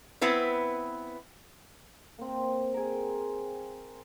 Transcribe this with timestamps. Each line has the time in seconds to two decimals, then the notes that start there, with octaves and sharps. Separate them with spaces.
0.21 B3 C4 E4 B4
2.18 A#3 C4
2.74 G#4 A#4